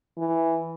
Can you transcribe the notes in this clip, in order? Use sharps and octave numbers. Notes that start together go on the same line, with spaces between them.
E3